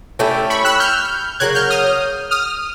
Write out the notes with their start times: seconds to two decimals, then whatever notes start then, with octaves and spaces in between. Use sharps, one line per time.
0.19 A3 C#4 E4 G4
0.50 B5 C#6
0.65 E6 F#6
0.80 F6 G6
1.40 C#3 F#3 A#3 F#6 G#6
1.55 F6 G6
1.70 D#6 F6
2.31 D#6 F6